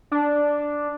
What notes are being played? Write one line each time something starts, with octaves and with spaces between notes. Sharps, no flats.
D4